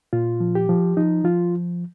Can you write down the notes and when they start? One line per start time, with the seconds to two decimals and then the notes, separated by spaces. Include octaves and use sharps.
0.13 A#2 F4
0.40 F3
0.55 G4
0.69 F3
0.97 F3 D#4
1.24 F3 F4